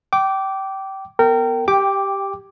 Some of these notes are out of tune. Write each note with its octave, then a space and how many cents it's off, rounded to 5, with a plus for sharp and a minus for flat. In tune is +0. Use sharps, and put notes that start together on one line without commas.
G5 -25 D6 -10
B3 +0 A#4 -25 G5 -20
G4 +0 G5 +15 D6 +0